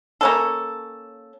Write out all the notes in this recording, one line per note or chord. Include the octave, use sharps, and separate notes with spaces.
A#3 C#4 A4